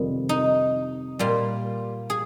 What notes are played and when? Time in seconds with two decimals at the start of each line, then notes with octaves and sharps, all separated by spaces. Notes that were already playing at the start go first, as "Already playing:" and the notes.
Already playing: F2 C3 D#3 G3
0.29 D#4
1.19 A#2 G3 F4
2.10 G#4